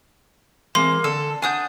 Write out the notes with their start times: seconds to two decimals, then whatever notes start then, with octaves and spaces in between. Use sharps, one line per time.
0.75 E3 G#3 A#3 C4 C6
1.04 D3 A4
1.42 D4 F#5 G#5 D#6 G6